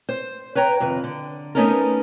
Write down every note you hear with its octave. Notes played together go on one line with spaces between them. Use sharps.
C5
B4 C#5 G5 A#5
F2 C3 D#3 B4
D3
A3 B3 C#4 D#4 A4 A#4